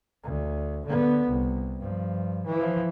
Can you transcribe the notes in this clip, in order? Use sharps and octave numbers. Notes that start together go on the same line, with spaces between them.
D2
D3 B3
C2
G2 F3
E3 F3